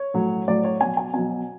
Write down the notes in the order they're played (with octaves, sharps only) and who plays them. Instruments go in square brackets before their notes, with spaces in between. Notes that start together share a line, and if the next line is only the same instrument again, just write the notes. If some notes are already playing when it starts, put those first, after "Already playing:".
Already playing: [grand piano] C#5
A2 F#3
A2 F#3 D5
C#5
B2 F#3 G#5
G#5
B2 F#3 G#5